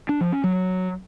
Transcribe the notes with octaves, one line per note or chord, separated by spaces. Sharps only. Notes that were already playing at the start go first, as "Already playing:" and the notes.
D4
F3
C#4
F#3